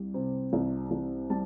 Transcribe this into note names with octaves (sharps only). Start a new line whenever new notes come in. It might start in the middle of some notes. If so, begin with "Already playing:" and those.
Already playing: C2 G3
C3
C2
C2
G3 A5